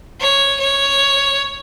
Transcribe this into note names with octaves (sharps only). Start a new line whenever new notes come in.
C#5
C#5